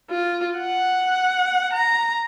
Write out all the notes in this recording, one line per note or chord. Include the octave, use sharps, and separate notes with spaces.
F4
F#5
A#5